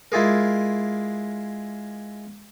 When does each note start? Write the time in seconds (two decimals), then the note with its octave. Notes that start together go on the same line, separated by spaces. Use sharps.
0.12 G#3 E4 F4 G#4 A#4